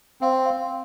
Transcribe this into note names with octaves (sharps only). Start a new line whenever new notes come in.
C4 F5
F5